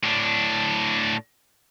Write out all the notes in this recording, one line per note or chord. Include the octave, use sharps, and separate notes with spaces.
A2 D4